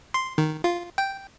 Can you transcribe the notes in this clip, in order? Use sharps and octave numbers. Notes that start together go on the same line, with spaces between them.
C6
D#3
F4
G5